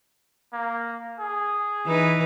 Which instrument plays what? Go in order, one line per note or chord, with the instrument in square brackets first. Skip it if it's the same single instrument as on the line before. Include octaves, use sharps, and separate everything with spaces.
[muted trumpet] A#3
G#4
[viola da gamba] E3 D#4 B4